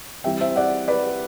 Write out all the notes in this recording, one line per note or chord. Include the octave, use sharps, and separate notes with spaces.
E3 G3 C4 E5 G5
C5 E5
D5 F#5
B4 D5